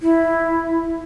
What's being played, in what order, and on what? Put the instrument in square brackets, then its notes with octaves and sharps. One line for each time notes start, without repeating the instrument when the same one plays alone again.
[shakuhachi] E4